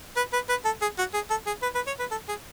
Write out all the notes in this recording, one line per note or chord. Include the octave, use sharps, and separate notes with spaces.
B4
B4
B4
A4
G#4
F#4
G#4
A4
G#4
B4
B4
C#5
B4
A4
G#4